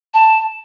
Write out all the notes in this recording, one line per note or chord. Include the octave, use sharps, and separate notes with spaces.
A5